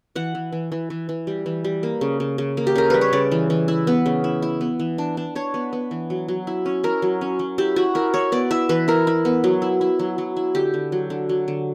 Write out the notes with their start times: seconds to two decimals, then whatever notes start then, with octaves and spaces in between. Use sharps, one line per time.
0.15 E3 F#5
0.35 E3
0.52 E3
0.72 E3
0.90 E3
1.09 E3
1.27 G3
1.46 E3
1.64 G3
1.83 A#3
2.01 C#3
2.20 C#3
2.38 C#3
2.57 A#3
2.67 G4
2.75 C#3 A#4
2.90 G3 B4
3.01 C#5
3.13 C#3 D5
3.32 E3
3.50 E3
3.68 E4
3.87 B3
4.06 C#3
4.24 E4
4.42 E4
4.61 B3
4.80 E3
4.98 D4
5.17 D4
5.35 D4 C#5
5.54 B3
5.73 B3
5.91 E3
6.10 F#3
6.28 F#3
6.47 E4
6.66 C#4
6.84 E4 A#4
7.02 F#3
7.21 C#4
7.39 F#3
7.58 E4 G4
7.76 E4 F#4
7.95 E4 A#4
8.14 E4 C#5
8.32 B3 D5
8.51 E4 E5
8.69 E3 B4
8.88 E4 A#4
9.07 E4
9.25 B3
9.44 F#3
9.62 E4
9.81 E4
9.99 F#3
10.18 F#3
10.37 E4
10.55 D3 G4
10.74 D3
10.92 F#3
11.10 D3
11.29 F#3
11.48 D3